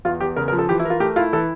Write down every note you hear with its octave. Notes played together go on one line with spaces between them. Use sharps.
E2 F4
E2 G4
C#3 A#4
A#4
F3
A4
E3 G4
E4
F4 A#4
A3 G4
E4 F4
E3 A4